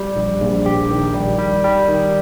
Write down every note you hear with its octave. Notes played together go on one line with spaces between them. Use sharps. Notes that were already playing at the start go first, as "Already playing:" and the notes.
Already playing: G3
A#1
A#1
G4
D#3
G3
G3
G3
D#3